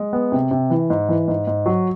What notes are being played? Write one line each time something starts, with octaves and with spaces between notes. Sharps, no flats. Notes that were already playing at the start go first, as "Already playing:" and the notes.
Already playing: G#3
B3
C3
C3
E3
G#2
E3
G#2
G#2
F#3